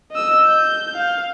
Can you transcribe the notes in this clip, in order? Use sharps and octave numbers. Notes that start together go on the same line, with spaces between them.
D#5 E6
G6
F5